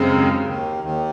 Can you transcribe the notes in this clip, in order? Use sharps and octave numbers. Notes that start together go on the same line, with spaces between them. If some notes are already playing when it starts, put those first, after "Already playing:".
Already playing: F#2 C#3 G#3 C4
D#2 D#3
C#3
D#2 D#3
D#2 D#3